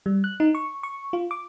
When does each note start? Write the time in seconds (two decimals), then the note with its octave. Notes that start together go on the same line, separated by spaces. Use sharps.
0.06 G3
0.24 F#6
0.40 D#4
0.55 C#6
0.83 C#6
1.13 F4
1.31 D6